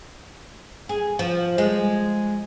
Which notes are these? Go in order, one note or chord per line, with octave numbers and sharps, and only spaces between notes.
G#4
F3
G#3